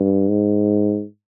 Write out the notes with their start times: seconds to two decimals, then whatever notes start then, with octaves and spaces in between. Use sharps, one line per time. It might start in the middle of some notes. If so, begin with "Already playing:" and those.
Already playing: G2
0.29 G#2